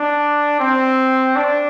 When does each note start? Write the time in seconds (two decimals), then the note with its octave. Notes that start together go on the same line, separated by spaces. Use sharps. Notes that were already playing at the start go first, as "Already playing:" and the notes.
Already playing: D4
0.59 C4
1.36 D4